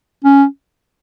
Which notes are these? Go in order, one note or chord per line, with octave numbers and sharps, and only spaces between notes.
C#4